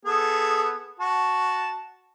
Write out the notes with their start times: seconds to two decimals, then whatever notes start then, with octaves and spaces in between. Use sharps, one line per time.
0.05 B3 G#4 A4
1.00 F#4 A5